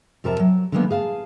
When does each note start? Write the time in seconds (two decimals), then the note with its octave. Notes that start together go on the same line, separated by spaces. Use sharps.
0.24 F2 C3 A#4 E5 A5 A#5
0.39 F#3
0.72 D3 D#3 F#3 G#3 A#3 B3
0.90 G#4 F5 G#5 A5